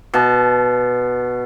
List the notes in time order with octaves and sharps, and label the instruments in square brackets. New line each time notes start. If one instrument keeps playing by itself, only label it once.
[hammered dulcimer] B2 A5